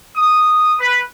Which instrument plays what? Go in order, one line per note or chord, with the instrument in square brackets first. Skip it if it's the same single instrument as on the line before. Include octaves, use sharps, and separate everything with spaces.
[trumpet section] D#6
B4